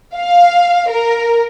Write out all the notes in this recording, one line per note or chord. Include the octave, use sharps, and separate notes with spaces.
F5
A#4